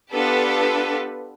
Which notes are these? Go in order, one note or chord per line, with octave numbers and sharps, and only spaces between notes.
B3 D4 F4 G4 A4 B4